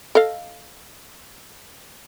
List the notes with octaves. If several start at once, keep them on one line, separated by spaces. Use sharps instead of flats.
A4 D#5 F5